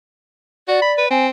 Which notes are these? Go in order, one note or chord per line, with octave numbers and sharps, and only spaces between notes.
F#4 D5
B5
B4
C4 G#5